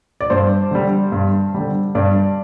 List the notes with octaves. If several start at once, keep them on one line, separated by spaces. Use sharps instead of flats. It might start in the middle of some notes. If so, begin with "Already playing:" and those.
D5
G2 C5
D3 G3
G2
D3 G3
G2 D5